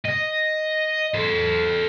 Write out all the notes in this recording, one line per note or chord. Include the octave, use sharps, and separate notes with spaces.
D#5
A4 C5